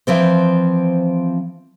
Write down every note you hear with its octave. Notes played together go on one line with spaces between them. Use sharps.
E3 F3 C4 C5